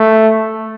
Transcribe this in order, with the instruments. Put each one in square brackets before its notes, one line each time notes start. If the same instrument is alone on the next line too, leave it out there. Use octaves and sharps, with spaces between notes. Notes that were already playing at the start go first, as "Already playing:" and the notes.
Already playing: [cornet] A3